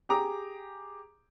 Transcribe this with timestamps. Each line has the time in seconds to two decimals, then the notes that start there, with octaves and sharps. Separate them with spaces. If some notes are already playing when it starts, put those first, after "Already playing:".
0.09 G4 G#4 A#5 D6